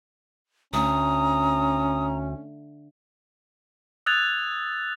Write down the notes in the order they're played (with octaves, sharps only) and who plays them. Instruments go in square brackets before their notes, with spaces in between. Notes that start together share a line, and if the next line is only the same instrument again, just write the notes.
[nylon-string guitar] D2 [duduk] C#4 [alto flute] A#5 [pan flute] D#6
[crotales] D#6 E6 F#6 G#6 A6 F7